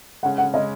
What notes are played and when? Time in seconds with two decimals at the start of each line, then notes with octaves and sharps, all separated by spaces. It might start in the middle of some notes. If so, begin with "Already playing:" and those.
0.23 C#3 G#3 C#4 F#5
0.38 F#5
0.53 C#3 G#3 C#4 D#5